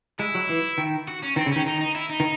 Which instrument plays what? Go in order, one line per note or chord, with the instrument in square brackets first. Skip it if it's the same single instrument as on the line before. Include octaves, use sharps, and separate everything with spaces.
[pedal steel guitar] G#3 [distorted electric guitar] E4
[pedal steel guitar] F#3
E3
D#3
[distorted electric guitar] F#4
C#4
[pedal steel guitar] D#3 [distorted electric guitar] C4
[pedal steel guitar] C#3
[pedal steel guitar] D#3 [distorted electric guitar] C#4
[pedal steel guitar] D#3 [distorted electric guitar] D#4
[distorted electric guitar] D#4
E4
D#4
[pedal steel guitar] D#3